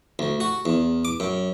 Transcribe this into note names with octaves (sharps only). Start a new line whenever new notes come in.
D2
F#4
E2
D6
F#2